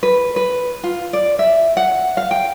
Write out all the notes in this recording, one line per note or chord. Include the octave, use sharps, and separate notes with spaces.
B4
B4
F4
D5
E5
F#5
F5
G5